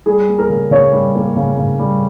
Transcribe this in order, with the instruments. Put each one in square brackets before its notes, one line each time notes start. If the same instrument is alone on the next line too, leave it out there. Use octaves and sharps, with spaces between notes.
[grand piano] G3 G#4
A#3
A#4
C#3
C#3 C#5
G3
A#3
C#3
C#3
G3